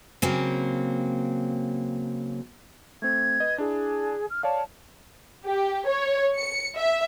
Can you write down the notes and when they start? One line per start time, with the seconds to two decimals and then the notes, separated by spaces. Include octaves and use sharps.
0.22 C#3 F#3 A#3 C4
3.02 A3 C4 G#6
3.40 B4 D#5
3.58 D4 E4 G#4
4.29 F6
4.43 C#5 D5 F5 A5
5.45 G4
5.88 C#5
6.36 C#7
6.76 E5